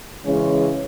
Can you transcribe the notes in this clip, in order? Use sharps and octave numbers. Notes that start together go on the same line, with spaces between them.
C#3 E3 G#3 C#4